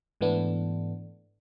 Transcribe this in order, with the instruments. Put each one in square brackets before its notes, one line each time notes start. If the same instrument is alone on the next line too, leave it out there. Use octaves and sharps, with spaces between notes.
[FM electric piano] G#2 E3 A3 B3 D4